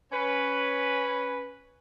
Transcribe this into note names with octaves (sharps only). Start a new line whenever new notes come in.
C#4 B4